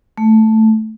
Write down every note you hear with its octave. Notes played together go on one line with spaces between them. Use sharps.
A3